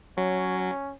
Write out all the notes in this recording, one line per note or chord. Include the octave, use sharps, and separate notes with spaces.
F#3 C#4